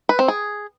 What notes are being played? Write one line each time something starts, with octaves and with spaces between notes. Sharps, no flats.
B4
C4
G#4